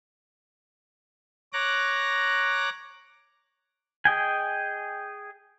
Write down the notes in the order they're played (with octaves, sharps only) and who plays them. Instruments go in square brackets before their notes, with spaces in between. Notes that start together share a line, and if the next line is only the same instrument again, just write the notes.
[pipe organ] C#5 A#5 D6 F#6 A#6
[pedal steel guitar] G#4 D#5 G5 G#5